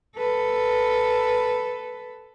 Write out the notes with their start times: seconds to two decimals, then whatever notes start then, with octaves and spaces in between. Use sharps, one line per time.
0.16 A4 B4